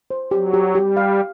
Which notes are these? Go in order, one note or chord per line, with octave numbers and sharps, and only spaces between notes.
C5
F#3 G4
G4
G3 G4
F5